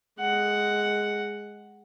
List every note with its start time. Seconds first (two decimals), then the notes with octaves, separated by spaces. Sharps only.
0.20 G#3 F#5